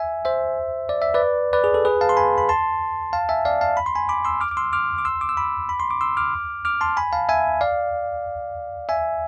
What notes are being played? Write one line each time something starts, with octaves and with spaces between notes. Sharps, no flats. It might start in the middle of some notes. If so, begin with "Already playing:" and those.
Already playing: E5 G#5
C5 E5
D5
E5
B4 D5
B4 D5
G#4
A4
G#4 B4
F5 A5
C6
G#5 B5
B5
A5 C6
F5 A5
E5 G#5
D5 F5
F5 A5
B5
C6
G#5 B5
B5 D6
C6 E6
D6 F6
D6
C6 E6
D6 F6
D6
C6 E6
D6
E6
B5 D6
B5
C6
D6
C6 E6
D6 F6
D6 F6
A5 C6
G#5 B5
F5 A5
E5 G#5
D5 F5
E5 G#5